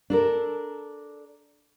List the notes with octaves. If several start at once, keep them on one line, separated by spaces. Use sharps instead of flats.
D4 A4 A#4